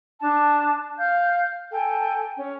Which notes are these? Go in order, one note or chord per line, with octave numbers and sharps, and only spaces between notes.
D4 A5
F5 G6
A4 G5 G#5
C#4